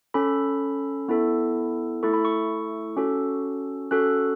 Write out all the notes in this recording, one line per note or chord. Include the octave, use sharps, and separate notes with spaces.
C#4 A4 B5
B3 E4 A4
A3 E4 A4 C#6
B5
C#6
C#4 F#4 A4
C#4 F#4 A4 F#6